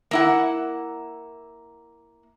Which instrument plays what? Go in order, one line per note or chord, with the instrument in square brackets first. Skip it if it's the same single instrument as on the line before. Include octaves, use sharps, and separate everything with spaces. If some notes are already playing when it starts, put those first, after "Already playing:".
[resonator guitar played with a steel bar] A#3 E4 F#5